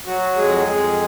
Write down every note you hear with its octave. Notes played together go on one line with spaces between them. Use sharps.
F#3 F#4
F2 G#3 G#4
F2 G#3 G#4